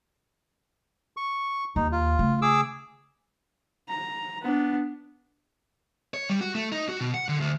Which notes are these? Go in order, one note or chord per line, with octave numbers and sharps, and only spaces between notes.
C#6
D#2 D#4
F4
C#3 A3
G#4 D6 E6
A#5
B3 D4
C#5
G3
F#4
A3
D#4
F#4
B2
F#5
D3
D2